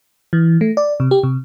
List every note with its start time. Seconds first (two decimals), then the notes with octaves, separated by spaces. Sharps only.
0.33 E3
0.61 A3
0.77 D5
1.00 C3
1.11 G4
1.23 C3